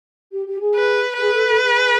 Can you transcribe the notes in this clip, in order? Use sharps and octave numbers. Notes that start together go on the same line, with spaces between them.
G4
G4
G#4
B4
G#4 B4
A4
A4
G#4